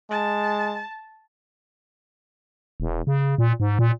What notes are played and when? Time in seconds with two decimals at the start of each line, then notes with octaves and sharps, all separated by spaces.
0.11 G#3 A5
2.80 E1
3.07 C#3
3.38 A#2
3.60 G#2
3.79 A#2